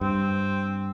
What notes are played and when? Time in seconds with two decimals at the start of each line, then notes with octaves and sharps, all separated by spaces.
0.01 G2 C4